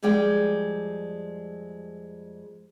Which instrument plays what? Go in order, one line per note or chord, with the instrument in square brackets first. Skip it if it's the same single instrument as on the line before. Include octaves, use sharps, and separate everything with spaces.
[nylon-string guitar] F2 G3 G#3 D5 G5